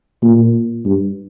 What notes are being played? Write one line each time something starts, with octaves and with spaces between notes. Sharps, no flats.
A#2
G2